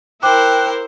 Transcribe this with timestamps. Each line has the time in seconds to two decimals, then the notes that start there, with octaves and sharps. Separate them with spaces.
0.23 E4 A#4 C5 G5 D6 F#6